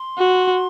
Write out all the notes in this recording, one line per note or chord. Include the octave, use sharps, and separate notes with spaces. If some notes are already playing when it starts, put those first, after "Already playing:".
Already playing: C6
F#4